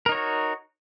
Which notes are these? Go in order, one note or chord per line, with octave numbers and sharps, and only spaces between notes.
D#4 F#4 A#4 C#5